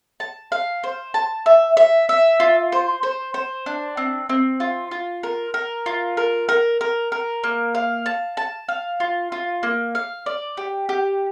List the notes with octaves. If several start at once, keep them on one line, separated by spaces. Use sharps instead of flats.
A5
F5
C5
A5
E5
E5
E5
F4
C5
C5
C5
D4
C4
C4
F4
F4
A#4
A#4
F4
A#4
A#4
A#4
A#4
A#3
F5
A5
A5
F5
F4
F4
A#3
F5
D5
G4
G4